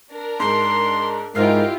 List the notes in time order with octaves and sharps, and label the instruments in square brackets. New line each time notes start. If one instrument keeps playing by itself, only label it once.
[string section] D4 A#4
[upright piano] G#2 [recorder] C6
[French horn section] G#2 [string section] E4 F4 G4 [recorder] A#4 [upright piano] F6 C7